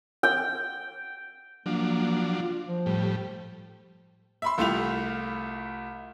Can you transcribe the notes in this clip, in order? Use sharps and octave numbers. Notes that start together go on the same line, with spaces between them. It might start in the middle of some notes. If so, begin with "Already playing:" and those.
G5
F3 F#3 A#3 D4
F4
F3
A2 G3
E5 B5 C6
C2 A3 E4 F4 G4 F7